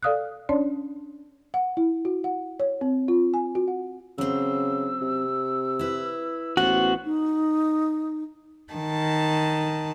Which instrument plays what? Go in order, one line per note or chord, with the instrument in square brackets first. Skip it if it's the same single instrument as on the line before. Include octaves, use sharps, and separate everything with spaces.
[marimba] A4 D5 F5 D#6 F6 F#6
C#4 D4 C#5 D5 A5 C6
[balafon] F#5
E4
F#4
F#5
C#5
C4
F4
G#5
F#4
F#5
[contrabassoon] C#3 [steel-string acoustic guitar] F#3 C4 [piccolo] E6
[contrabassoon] C3
[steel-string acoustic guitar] E4 B4
[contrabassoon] A1 [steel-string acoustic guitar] B3 C5 [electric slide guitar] F#4
[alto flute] D#4
[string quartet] D#3 A5